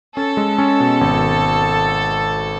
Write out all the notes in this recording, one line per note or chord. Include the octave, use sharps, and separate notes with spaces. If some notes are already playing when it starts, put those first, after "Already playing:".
C#4 A4
G#3
C#4
B2
G#1